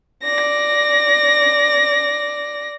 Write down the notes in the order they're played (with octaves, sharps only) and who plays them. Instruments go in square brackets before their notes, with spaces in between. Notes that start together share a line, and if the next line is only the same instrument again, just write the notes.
[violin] D5 A#6